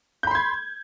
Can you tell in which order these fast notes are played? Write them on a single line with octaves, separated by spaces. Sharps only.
G6 B5 C6 G#6